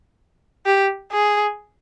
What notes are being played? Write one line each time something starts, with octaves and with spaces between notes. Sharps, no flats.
G4
G#4